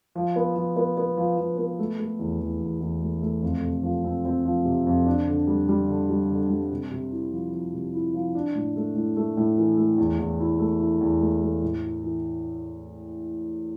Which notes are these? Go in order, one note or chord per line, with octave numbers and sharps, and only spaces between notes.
F3
B3
F3
B3
B3
F3
F3
B3
A3
A3
E2
E2
E2
E2
A3
A3
F2
C3
F3
C4
C4
F3
C3
F2
D4
D3
G3
G3
D3
G3
D3
G3
C3
C3
E4
F3
F3
C3
E4
F3
D4
A2
A3
A2
A3
A2
E3
A3
E2
E2
E4
A3
E4
E2
A3
A3
A2
E4
E3